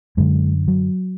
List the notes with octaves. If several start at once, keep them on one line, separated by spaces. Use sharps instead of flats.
F#2 D3 G#3
F#3